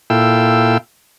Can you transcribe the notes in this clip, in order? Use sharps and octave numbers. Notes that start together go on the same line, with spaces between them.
A#2 E4 A4 F5 G5 E6